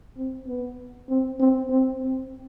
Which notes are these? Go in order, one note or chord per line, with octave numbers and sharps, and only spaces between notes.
C4
B3
C4
C4
C4
C4